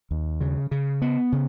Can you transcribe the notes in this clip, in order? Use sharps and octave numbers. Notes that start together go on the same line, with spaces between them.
D#2
C#3
C#3
B3
C#3